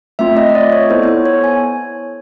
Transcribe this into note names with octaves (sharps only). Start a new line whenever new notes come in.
A3 C4 F4 E5
D#5
D#5
D5
C#5
B3 E4 A4 C5
C5
C#5
C#5
G#5